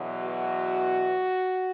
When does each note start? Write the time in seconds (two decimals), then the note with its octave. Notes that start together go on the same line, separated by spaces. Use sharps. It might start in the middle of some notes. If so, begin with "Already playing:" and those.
Already playing: E2 B2 F#3
0.24 F#4